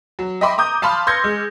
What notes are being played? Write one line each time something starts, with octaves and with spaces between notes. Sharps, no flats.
F#3
D#5 E5 G5 B5 C6 D6
A#5 D6 D#6 G6
F5 A5 B5 C6 F6
C6 E6 G6 G#6 A#6 C#7
G#3